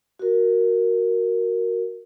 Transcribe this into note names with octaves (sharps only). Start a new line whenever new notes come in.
F#4 A#4